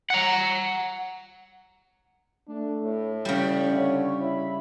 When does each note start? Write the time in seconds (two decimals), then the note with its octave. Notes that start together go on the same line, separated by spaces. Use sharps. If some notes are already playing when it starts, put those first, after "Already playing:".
0.10 F#5 A#5
2.48 A3 D4
2.84 A2
3.25 C#3 G3 F5
3.72 D3 C#5
4.20 E4 B5